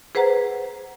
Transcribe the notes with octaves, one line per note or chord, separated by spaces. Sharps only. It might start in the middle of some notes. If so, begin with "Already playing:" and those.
G#4 B4 C5 F#5 A#5